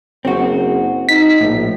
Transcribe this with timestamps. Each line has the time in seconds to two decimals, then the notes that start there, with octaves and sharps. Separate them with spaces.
0.25 F#1 C4 F#4
1.09 D#4 B6
1.41 A#1 A2